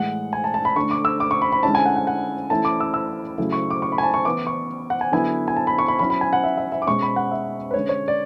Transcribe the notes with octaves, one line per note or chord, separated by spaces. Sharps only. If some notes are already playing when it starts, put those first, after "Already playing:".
Already playing: A2 E3 G#3 F#5
G#5
A5
A5
B5
D3 A3 D4 C#6
D6
E6
D6
C#6
B5
B5
D3 G#3 C#4 E4 A5
G#5
F#5
F#5
F#5
E3 A3 C#4 E4 A5
D6
E6
E6
C#3 F#3 A3 C#4 E4
C#6
D6
C#6
B5
G#5
A5
C#6
E3 B3 E4 D6
C#6
F#5
G#5
D3 F#3 B3 E4 G#5
G#5
A5
B5
C#6
B5
F#3 C#4 E4 B5
B5
G#5
F#5
E5
E5
E5
D6
B2 G#3 C#4 C#6
B5
F#5
E5
B4
D3 G#3 C#4 C#5
C#5
D5